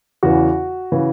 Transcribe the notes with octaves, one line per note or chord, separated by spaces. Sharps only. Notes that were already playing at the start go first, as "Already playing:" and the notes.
E2 C#3 E3 F#4
C#3 E3